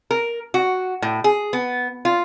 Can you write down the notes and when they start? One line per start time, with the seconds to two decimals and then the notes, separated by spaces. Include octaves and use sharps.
0.11 A#4
0.54 F#4
1.02 A2
1.24 G#4
1.53 B3
2.05 F4